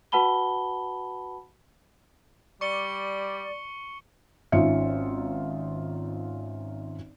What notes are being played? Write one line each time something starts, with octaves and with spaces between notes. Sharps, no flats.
F#4 B4 F#5 A5 B5 G7
G3 D5 C#6 C#7 G7
G#1 C#4 D#4 F4 E5 C#7